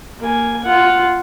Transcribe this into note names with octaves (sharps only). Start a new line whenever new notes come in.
A#3 G#5
F4 F#5